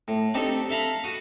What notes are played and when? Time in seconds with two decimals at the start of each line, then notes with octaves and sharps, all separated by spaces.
0.08 A2
0.34 C4 D4 D#4 G4 A4
0.69 A4 E5 F5 A#5 B5
1.04 F#4 D#6